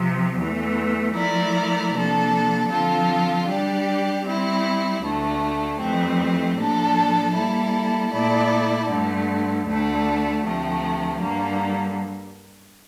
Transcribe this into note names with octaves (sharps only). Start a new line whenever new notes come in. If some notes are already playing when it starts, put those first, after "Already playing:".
Already playing: C3 F3 C4
E2 E3 A3
F3 A3 E4 A#4 D5
C3 F3 A#3 D4 A4
D3 F3 C4 F4 A4
G3 D4 G4 D5
G3 C4 E4
D2 D3 A3
F2 E3 A3 C4 G4
A2 F3 A#3 D4 A4
G3 A#3 E4 A4
A#2 A3 E4 A4 D5
G2 D3 A3
D2 D3 A3 D4
D2 C3 F3 A3
G2 D3 G3 A#3